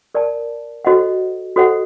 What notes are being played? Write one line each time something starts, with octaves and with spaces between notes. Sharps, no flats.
A#4 D5 A5
F#4 A4 C5 D#5 F#5
F#4 A4 C5 D#5 F#5